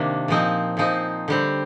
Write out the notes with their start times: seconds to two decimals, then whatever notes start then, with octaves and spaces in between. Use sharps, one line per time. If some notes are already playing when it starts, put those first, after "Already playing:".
Already playing: C3 D#3 A#3 D4
0.28 A#2 F3 C4 D#4
0.77 A#2 F3 C4 D#4
1.28 D3 G3 C4